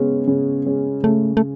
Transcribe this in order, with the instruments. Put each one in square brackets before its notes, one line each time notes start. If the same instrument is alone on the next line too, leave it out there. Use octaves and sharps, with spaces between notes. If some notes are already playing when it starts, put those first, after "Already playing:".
Already playing: [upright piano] C#3 G#3 C#4 [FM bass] B3
[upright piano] C#3
G#3 C#4
[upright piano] C#3 [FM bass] A3
[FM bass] A3